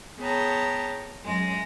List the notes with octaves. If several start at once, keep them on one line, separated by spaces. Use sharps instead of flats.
B3 G#4 C#5 G5 A5 A#5
F#2 G#3 A#6